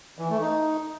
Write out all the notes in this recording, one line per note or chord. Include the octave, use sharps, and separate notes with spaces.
E3
A3
D#4